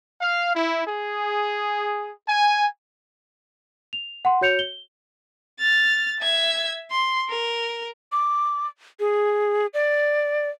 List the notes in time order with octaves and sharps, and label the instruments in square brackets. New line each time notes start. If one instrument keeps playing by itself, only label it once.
[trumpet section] F5
E4
G#4
G#5
[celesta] F7
F#5 C6
F#4 C#5 G6 C#7 F7
G7
[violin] F6 A6
E5 G#6
C6
A#4
[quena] D6
G#4
D5